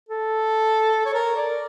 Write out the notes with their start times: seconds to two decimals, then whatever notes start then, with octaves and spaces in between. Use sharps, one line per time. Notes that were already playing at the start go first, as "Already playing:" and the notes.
0.09 A4
1.05 C#5
1.14 A#4
1.36 D5